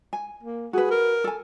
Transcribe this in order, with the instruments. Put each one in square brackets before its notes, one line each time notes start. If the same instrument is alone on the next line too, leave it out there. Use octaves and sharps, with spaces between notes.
[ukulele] G#5
[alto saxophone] A#3
[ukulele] F#4 B4 [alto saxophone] G#4
[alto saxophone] A#4
[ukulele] A4 G#5